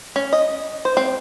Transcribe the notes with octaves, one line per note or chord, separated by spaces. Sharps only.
C#4
D#5
C5
C4